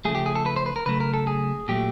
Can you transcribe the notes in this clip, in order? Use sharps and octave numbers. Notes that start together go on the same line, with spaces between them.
C#3 F3 A3 G#4
G4
G#4
A4
B4
C5
B4
A#4
C#3 F#3 A3 B4
A#4
A4
G#4
A#2 F#3 A3 G4